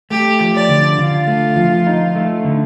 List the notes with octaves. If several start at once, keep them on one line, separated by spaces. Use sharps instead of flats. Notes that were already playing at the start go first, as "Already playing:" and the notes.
A3 G4
F3
D5
D3
D3 F4
A3
F3
D#4
A3
D3